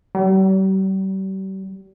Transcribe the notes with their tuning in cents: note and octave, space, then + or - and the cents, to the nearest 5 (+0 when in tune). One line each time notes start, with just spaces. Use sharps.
G3 -40